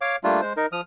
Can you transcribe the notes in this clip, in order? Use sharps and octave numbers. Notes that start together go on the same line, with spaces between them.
C#5 F5 D6
G3 A3 A#3 D4 F4
G#3 C5
D#4 A#4
F3 D#6 F6